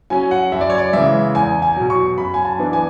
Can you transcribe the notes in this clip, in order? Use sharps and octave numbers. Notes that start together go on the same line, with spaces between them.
F#3 C#4 G#5
F#5
F#2 E5
D5
C#5
D5
C#3 E3 G#3 E5
E2 G#5
G#5
B2 F#3
C#6
F#2 B5
G#5
A5
E3 B3 D4
G#5